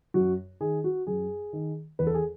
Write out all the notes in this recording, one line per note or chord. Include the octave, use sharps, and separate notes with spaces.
F#2 F#4
D#3 G#4
F#4
F#2 G#4
D#3
E2 B4
A4
G#4